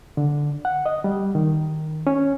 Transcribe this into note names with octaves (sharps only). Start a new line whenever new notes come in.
D3
F#5
D#5
G3
D#3
C#4